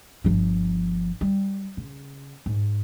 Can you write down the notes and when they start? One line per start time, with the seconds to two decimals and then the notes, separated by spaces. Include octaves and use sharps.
0.24 G1 F3
1.21 G3
1.77 C#3
2.46 G#2